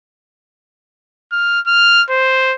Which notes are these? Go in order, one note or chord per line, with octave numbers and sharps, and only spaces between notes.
F6
F6
C5